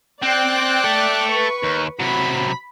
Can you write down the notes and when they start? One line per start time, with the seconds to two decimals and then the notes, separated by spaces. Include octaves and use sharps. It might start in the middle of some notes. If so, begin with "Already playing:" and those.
0.23 C4 D5 G5 F#6
0.84 A4 E5
1.28 B4 C#6
1.63 D#2
2.00 C3 F#3 B5